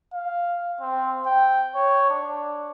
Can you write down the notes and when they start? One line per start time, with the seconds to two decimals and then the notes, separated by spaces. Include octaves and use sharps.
0.14 F5
0.81 C4
1.25 G5
1.75 C#5
2.10 D4